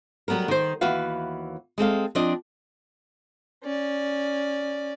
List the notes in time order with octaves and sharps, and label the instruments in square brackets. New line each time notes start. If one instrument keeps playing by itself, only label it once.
[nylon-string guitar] F#3 G3 B3 A4 A#4
D#3 C5
D#2 E3 B3 F#4 B4 F5
G#3 C4 A4 F5
F3 C4 D4 D5 D#5
[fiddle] C#4 D5